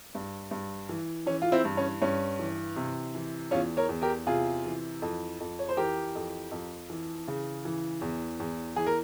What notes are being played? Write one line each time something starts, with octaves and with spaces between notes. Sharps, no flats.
G2
G2
E3
E3 C#4
F4
C4 E4
G2
C#4
G2 C#4
E3
C3
E3
E2 C#4 F4
A#4 C#5
E2
G4 A#4
C3 F4 G#4
E3
F2
F2
C#5
C5
E3 G4 A#4
F2
F2
E3
C#3
E3
E2
E2
E3 G#4
A#4